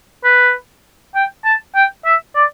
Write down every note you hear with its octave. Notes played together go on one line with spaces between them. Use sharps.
B4
G5
A5
G5
E5
D5